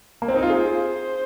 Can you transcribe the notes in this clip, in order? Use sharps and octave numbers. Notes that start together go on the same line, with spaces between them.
A#3
C4
D#4
F4
G#4 C5